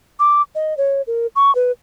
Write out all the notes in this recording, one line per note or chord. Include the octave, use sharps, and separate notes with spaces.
D6
D#5
C#5
A#4
C#6
B4